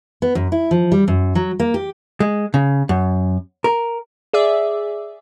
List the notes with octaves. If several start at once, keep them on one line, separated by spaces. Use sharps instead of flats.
B3
F#2
E4
F3
G3
F#2
F#3
A#3
G4
G#3
C#3
F#2
A#4
G#4 D5 E5